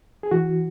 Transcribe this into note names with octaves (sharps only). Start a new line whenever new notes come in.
G#4
E3 F#4